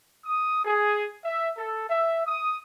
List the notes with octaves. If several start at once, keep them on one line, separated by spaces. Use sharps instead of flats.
D#6
G#4
E5
A4
E5
D#6